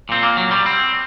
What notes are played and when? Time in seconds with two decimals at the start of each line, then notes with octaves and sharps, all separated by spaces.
0.09 A#2 C4
0.23 A#3
0.37 F#3
0.51 G3
0.66 C4